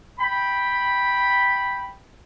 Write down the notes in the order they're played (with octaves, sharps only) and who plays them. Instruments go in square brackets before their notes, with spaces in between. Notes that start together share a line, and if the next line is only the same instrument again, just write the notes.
[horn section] G5 B5